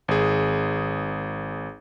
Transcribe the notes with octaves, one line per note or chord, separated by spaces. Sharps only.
G#1 G#4